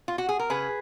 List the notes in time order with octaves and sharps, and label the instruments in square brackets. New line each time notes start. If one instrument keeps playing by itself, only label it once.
[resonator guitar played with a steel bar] F4
F#4
G#4
A#4
C#3 G#4 B4